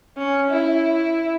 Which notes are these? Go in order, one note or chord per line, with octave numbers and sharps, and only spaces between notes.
C#4
E4